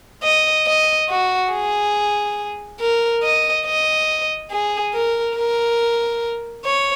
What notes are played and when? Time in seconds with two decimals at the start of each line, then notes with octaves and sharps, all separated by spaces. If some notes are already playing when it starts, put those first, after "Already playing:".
0.24 D#5
0.67 D#5
1.10 F#4
1.53 G#4
2.80 A#4
3.23 D#5
3.66 D#5
4.51 G#4
4.94 A#4
5.37 A#4
6.65 C#5